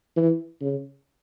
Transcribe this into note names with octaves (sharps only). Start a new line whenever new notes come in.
E3
C#3